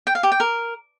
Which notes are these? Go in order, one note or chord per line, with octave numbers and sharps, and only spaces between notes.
G5
F5
G4
G5
A#4